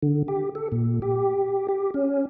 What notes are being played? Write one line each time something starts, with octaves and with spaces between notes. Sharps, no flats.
D3
G4
A4
A#2
G4
G4
C#4